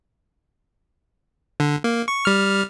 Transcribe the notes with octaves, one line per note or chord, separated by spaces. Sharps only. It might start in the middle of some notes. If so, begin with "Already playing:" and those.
D3
A#3
C#6
G3 F6